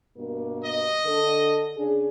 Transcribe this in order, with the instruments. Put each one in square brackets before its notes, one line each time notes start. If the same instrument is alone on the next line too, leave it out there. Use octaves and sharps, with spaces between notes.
[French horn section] G2 B2 A#3
[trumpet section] D#5
[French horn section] D3 A4
C#3 D4 G#4